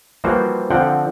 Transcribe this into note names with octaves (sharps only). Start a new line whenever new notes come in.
E3 F3 G3 A#3 F#4 C5
D3 F3 C4 F#5 G5